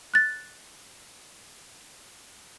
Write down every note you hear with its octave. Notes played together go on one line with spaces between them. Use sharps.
F#6 A6